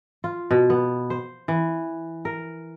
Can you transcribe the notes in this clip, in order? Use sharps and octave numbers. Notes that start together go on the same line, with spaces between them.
F4
B2
B3
C5
E3
A#4